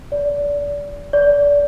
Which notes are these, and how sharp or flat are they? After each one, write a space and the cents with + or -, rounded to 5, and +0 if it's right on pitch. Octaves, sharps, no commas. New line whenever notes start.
D5 -30
D5 -30